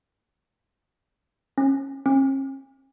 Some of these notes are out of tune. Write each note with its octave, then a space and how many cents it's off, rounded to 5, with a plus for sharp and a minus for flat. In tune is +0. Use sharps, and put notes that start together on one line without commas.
C#4 -25
C#4 -45